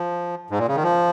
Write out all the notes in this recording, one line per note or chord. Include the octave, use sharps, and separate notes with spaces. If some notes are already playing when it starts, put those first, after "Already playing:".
Already playing: F3
G#2
A#2
C#3
D#3
F3